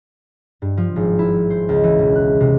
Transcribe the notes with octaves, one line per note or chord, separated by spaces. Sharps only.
G2
F3
G#1
E4
C5
C#2
E3
E1
F#6
C3